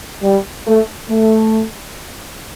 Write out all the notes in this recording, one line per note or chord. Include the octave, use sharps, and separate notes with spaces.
G3
A3
A3